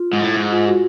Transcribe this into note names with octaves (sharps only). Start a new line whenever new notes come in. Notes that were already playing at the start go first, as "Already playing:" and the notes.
Already playing: F4
G#2
A2
G#2
F4
F#4